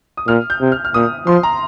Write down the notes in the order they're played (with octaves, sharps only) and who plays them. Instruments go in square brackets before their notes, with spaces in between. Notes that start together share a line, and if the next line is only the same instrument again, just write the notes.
[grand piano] D#6
[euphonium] A#2 [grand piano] F6
[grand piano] G6
[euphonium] C3
[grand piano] F6
F6
[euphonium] A#2 [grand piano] D#6
[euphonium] F3 [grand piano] C6
[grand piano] A#5